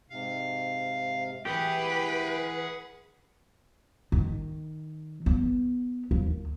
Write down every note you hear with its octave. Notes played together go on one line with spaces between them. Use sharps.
G#2 C3 F5
E3 G4 G#4 B4 F#5
D#3
B3
D#2